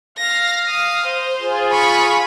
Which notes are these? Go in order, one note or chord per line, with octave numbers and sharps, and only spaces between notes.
F5 A#6
D#6
C5
F4 G#4
B5 C#6